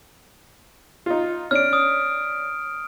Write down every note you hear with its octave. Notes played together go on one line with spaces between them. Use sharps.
D#4 F4
C#4 D4 F6 D7
D#6